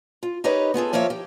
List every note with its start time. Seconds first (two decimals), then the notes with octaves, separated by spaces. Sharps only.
0.23 F4
0.44 D#4 G4 A#4 B4 C#5 D#5
0.74 B3 F4 G#4 A4
0.93 F3 A#3 F4 C#5 E5
1.10 G4